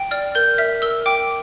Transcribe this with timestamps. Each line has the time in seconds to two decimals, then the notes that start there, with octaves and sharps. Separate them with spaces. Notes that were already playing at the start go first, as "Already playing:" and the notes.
Already playing: G5
0.11 D5 F6
0.35 A#4 G6
0.58 E5 F6
0.82 A#4 E6
1.06 G5 D6